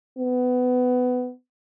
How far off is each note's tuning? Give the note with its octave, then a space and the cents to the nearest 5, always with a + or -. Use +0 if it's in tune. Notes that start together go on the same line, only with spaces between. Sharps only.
B3 +20